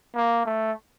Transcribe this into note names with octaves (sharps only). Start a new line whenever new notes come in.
A#3
A3